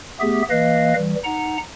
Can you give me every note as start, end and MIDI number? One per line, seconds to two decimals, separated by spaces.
0.20 0.42 57
0.20 0.42 59
0.20 0.42 67
0.20 0.42 68
0.20 0.42 76
0.50 0.94 52
0.50 0.94 58
0.50 0.94 71
0.50 0.94 75
0.50 0.94 77
0.95 1.15 52
0.95 1.15 55
1.24 1.57 63
1.24 1.57 78
1.24 1.57 82